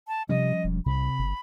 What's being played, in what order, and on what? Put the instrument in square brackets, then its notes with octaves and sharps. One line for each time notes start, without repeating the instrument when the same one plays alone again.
[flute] A5
[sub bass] C3 [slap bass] F3 G3 C#4 [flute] D#5
[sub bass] E1
[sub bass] C2 [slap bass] C3 [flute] B5
[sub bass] G1